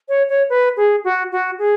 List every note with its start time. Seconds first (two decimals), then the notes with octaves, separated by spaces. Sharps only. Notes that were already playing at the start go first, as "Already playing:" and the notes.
0.09 C#5
0.29 C#5
0.50 B4
0.77 G#4
1.04 F#4
1.32 F#4
1.59 G#4